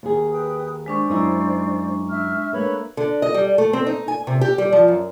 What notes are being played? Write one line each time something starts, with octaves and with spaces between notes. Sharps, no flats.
D#2 G#4
B4 G5 D#6
G#3 D4 C5 D5 C#6
F#2 D#4 E4
E5 F6
A3 A#3 B4 C#5 B5
D3
D#5
G3
A3
C4
D#4
G#5
C3
G4
G3
F3
F#2